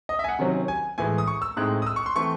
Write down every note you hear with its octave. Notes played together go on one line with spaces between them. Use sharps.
D#5
E5
G#5
F#5
C3 D#3 F#3 C#4
G#5
A2 E3 G#3 G#5
D#6
C#6
E6
A2 G#3 C4 D#4 F#6
D#6
E6
C#6
C6
E3 A3 C4 C#6